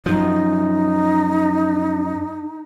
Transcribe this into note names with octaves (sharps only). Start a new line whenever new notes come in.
F#2 F3 D#4